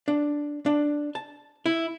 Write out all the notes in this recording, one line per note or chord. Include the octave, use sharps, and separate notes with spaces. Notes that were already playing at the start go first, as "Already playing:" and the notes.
D4
D4
A5
E4